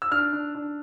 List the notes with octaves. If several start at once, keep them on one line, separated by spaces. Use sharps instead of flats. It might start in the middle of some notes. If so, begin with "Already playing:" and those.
E6
D4 F6
D4
D4